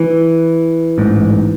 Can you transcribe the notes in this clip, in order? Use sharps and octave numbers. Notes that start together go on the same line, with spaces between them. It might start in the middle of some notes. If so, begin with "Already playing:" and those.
Already playing: E3
A1 G#2